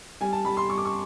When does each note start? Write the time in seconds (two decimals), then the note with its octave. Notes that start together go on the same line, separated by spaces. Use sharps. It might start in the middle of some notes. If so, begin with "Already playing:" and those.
0.21 G3 G#5
0.33 A5
0.45 G3 B5
0.57 C6
0.70 G3 C#6
0.78 D6
0.85 C#6